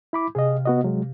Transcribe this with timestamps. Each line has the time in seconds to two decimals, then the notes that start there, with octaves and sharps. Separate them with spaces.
0.13 E4 B5 D6
0.35 C3 G#4 D#5 F5 F6
0.66 B3 F#4 D#5
0.84 F#3 G#3